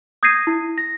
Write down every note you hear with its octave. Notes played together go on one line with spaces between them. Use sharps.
D#6 G6 G#6 A#6 C7 D#7
E4
A#6